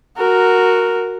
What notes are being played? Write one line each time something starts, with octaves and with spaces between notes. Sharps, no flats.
F#4 A#4